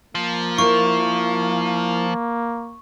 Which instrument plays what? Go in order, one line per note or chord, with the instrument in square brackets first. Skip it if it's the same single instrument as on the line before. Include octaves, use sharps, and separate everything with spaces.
[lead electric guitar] F3 [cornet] A#3
[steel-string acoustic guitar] E4 A#4 [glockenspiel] C#6